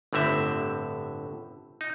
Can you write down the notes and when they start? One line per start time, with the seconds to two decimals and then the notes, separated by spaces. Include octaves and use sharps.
0.13 G1 A2 D3 C4 E5
1.81 D#4